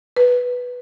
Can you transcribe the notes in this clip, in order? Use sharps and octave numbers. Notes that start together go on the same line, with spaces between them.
B4